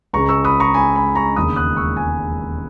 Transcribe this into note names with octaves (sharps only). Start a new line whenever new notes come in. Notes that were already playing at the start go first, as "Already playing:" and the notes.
C#2 C#3 G#3 C#4 A#5 C#6
C#6 E6
B5 D#6
A#5 C#6
G#5 B5
G#5 B5
A#5 C#6
E1 D#2 C#3 B5 D#6
D#6 F#6
C#6 E6
G#5